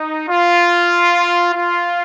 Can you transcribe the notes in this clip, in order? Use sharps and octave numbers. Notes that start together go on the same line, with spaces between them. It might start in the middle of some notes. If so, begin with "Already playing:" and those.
Already playing: D#4
F4
F4